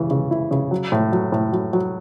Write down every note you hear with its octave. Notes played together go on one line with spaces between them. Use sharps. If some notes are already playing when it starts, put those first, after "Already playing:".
Already playing: C#3 E3
C#3
E4
C#3
F#3
A2
F#3
A2
F#3
F#3